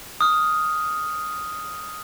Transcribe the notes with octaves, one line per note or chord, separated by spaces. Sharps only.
D#6 F6